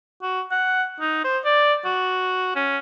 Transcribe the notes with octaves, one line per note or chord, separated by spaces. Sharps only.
F#4
F#5
D#4
C5
D5
F#4
C#4